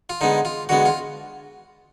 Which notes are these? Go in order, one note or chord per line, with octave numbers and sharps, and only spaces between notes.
F4
D3 G#3 B3 D#4
F4
D3 G#3 B3 F#4
F4